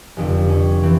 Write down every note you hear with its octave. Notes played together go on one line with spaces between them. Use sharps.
F1 F2 D3
C#4
E3 C4